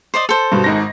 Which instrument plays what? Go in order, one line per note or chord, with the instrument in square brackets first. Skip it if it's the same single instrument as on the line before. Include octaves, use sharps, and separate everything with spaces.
[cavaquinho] C5 D5 D#5
A4 C5
[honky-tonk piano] G2 B2
G#1 G#2 A#6